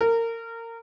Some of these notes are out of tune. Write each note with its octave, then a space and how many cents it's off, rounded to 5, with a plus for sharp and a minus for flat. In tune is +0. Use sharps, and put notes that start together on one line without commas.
A#4 -25